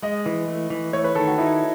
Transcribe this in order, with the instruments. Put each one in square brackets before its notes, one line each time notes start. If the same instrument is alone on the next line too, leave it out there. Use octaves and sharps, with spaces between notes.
[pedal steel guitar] G#3 [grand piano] D#5
[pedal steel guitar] E3
A3
E3
[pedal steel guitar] A3 [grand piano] C#5
[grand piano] B4
[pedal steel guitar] D#3 [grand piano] A4
[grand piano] F#4
[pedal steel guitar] D#4 [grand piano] E4